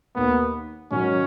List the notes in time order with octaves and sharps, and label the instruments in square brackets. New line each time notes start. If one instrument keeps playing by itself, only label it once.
[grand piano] D#2 D#3 A#3 [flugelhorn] B3
[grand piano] G#2 D#3 F#3 [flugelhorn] C#4